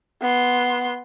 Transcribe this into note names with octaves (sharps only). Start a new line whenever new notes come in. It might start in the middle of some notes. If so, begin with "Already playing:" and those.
B3 C6